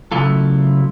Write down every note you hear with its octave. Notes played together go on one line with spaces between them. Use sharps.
C#3 F#3 A3 E4 F4 A4